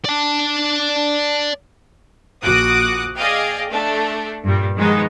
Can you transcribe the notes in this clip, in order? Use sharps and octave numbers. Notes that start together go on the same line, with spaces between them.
D5 A5
A#1 F#4 D6 D#6 F#6
G#4 D5 D#5 F5 G5
A3 D4
G2 A#2 G3
D#3 F3 G#3 B3 D#4